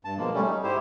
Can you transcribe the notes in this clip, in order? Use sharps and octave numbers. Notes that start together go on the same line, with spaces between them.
G2 A5
B2 F3 G#3 A#3
G3 A3 C#4
D#4
G#2 E4 G4 C5